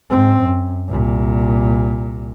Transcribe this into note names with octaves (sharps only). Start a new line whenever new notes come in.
G#2 C4
F#2
C2 A#2